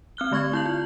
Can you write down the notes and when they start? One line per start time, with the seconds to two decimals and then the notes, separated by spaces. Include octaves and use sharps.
0.17 C4 F6 F#6 G7
0.31 D3 A3 C#6 G#6
0.53 E4 G6 F#7
0.66 F4